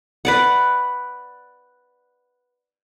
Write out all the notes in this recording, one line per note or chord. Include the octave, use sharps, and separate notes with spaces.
B4 D5 F#5